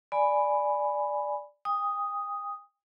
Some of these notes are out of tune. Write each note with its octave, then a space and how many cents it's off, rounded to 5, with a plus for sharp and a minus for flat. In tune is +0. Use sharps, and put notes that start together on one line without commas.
D5 +0 G#5 +0 B5 +0
G5 +45 D#6 +0